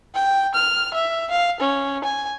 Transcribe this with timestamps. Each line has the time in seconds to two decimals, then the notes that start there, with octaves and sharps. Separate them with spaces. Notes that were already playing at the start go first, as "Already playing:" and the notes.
0.15 G5
0.55 F6
0.94 E5
1.31 F5
1.60 C#4
2.04 G#5